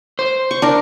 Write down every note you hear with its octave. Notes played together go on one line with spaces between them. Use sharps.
C5
C#6
D4 A#4 C6